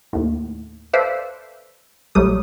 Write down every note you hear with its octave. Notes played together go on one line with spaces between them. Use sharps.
D#2 A2
A4 B4 C5 D5 E5 F5
A#1 A2 F#3 G3 D#6